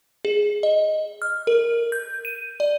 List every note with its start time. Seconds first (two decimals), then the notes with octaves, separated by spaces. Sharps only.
0.25 G#4
0.63 D#5
1.22 F6
1.47 A#4
1.92 G6
2.25 D#7
2.60 D5